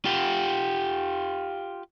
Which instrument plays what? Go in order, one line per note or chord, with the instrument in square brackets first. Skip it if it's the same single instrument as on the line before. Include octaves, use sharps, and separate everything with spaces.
[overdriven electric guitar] F4 G4